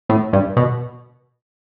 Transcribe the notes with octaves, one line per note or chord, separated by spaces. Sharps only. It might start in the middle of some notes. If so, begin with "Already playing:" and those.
A2
G2
B2